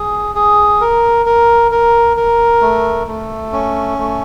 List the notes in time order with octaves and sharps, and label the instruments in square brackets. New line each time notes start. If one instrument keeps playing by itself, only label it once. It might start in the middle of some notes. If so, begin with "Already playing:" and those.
Already playing: [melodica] G#4
G#4
A#4
A#4
A#4
A#4
A3
A3
C#4
A3